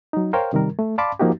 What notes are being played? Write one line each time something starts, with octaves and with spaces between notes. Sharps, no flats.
F#3 D#4
A#4 C5 C#5 F5 G5
C3 D#3 G3 A#4
A3
D5 F5 A5 B5 C6 D6
F3 A#3 D#4 F#4 G4